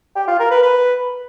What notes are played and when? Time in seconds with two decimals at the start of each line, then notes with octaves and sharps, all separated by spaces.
0.16 G4
0.28 F4
0.39 A#4
0.51 B4
0.62 B4